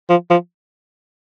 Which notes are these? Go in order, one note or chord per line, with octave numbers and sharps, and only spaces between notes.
F3
F3